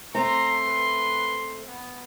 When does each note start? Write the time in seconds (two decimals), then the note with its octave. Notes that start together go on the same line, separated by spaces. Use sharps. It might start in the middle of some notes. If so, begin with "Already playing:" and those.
0.15 A3 C4 A#5 C6
0.67 B4
1.67 B3